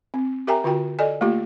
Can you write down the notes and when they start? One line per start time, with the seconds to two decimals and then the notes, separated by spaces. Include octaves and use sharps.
0.14 C4
0.47 G4 A#4 E5 G5 G#5 A#5
0.64 D3 F4 F#4 G5
0.99 A4 D5 D#5 G#5
1.21 A3 A#3 F4 G4